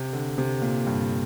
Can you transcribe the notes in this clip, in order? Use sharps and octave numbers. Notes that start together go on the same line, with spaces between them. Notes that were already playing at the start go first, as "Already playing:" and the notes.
Already playing: C3
D3
C3
A#2
G2